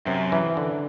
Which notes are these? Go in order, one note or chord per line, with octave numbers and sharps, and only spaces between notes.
F#2 C3
E3
D3